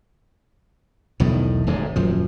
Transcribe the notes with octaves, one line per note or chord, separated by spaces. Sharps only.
B1 E2 A2 D#3
D1 D2 G#2 C3
D#1 F#2 F3